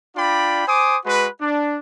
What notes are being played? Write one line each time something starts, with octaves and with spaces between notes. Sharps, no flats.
D4 F4 D5 G5 B5
C5 G#5 D6 D#6
G#3 F#4 B4
D4